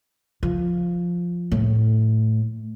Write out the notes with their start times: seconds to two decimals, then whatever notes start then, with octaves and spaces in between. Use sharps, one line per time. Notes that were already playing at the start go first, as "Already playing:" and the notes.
0.43 F3
1.52 A2